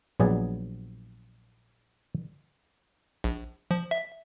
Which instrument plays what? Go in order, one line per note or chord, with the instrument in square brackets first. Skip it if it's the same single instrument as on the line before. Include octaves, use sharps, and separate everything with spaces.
[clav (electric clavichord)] A#1 F#3 B3 G#4 D5 G#5
[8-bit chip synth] A#1
F3
E5